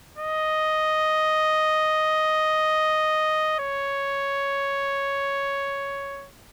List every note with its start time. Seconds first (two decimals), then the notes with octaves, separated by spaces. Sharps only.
0.18 D#5
3.59 C#5